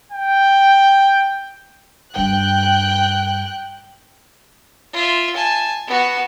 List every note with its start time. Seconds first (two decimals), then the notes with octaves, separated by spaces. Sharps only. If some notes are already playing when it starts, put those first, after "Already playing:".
0.12 G5
2.16 G2 D4 G5 F#6
4.93 F4 E5
5.36 G#5 A5
5.87 B3 F#4